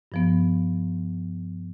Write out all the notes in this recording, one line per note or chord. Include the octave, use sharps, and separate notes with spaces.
G2 F3 B3